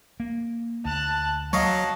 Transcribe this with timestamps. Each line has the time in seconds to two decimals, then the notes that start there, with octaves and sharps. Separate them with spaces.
0.20 A#3
0.85 D2 A5 F#6
1.53 F#3 F#4 C#5 D#5 F5 A5